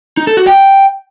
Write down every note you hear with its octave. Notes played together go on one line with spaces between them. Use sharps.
D#4
A4
F#4
G5